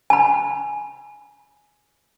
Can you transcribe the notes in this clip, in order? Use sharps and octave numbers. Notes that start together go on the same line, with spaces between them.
G#5 B5